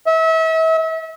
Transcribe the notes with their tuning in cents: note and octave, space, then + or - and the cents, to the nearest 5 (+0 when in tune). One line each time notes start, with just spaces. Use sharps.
E5 -35